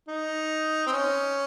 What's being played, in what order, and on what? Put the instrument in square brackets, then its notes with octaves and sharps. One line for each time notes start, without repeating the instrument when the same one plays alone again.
[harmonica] D#4
C4
C#4